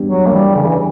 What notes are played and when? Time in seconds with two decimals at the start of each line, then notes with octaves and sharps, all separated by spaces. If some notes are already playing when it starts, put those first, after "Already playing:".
Already playing: E3 G3 B3 D4 G4
0.09 F#3
0.27 A#3
0.32 E3 G3
0.55 C#3
0.67 E3